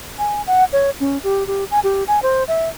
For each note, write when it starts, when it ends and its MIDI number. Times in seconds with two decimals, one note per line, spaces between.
0.19 0.42 80
0.47 0.64 78
0.73 0.90 73
1.00 1.18 61
1.24 1.47 67
1.47 1.64 67
1.71 1.80 80
1.84 2.04 67
2.08 2.22 80
2.23 2.44 72
2.48 2.69 76